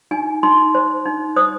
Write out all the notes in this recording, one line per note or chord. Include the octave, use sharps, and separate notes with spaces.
D#4 G#5
D#4 C6
C5
D#4
C5 D#6